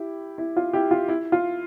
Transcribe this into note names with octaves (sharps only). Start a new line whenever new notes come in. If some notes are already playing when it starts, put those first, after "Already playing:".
Already playing: E4 G4
E4
F4
E4 G4
F4
E4
F4